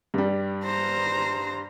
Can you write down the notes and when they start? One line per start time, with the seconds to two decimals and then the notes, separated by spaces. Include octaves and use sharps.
0.14 G2 G3
0.64 C5 A#5